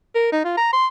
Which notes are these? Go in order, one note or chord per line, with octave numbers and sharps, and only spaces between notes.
A#4
D#4
F4
A#5
C6